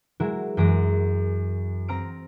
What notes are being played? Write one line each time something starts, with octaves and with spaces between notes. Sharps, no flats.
F#3 G#3 E4 F#4 A#4
F#2 E3 G#3 A#6 D7
C4 A#5 F6 D7